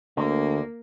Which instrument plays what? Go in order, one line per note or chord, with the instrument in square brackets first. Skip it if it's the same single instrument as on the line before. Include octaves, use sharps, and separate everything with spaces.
[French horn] D2 [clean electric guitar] D3 [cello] A#3